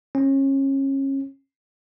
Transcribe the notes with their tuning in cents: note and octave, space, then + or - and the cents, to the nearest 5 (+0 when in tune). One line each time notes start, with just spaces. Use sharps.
C#4 -30